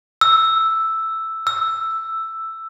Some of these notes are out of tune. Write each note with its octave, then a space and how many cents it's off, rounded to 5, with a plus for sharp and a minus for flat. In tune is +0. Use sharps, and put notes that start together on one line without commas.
E6 +0
E6 +5